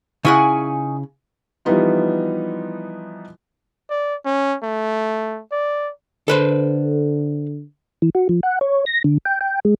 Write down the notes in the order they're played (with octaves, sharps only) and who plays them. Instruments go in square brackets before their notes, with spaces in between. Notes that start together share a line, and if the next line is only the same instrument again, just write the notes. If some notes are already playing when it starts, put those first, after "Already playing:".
[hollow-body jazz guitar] C#3 E4 F#5 [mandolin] D#4 G#5 C#6
[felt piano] E3 F3 G3 B3 D#4 F4
[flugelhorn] D5
C#4
A3
D5
[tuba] D3 [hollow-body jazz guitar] A4 B4 C5
[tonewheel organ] E3
F#4
F3
F#5
C#5
A#6
D3
G5
G5
G#3